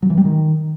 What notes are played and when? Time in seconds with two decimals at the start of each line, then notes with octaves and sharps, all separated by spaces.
0.02 F#3
0.10 E3
0.17 G3
0.25 D#3